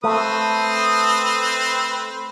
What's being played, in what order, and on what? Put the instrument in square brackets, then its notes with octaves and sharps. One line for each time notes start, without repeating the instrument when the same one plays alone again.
[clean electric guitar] A3 [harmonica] C4 B4 [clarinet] D#6